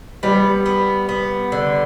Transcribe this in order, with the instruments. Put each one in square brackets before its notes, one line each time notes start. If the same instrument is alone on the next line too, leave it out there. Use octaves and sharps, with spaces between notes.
[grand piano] G3 [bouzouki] B3
[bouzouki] B3
B3
D3